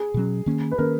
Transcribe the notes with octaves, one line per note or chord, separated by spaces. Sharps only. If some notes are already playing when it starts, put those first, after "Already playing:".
Already playing: G#4
B2 F#3 C#4
D#3 A#3 C#4
B4
D#3 A#3 C#4 A#4